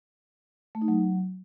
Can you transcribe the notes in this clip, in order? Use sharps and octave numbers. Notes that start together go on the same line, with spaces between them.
A3
D#4
F#3